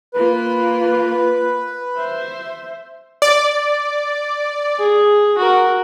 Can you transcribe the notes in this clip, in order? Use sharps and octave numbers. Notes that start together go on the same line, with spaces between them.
A#3 F4 B4
C5 E5
D5
G#4
F#4 A#4